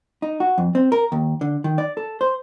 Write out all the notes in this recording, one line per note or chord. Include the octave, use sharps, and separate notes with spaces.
D#4
F#4
F2
C4
A#4
D#2
D3
D#3
D5
A4
C5